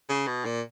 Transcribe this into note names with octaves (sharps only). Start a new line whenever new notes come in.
C#3
B2
A#2